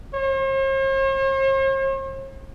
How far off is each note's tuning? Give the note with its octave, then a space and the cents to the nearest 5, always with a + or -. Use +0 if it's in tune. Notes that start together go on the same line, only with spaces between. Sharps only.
C5 +45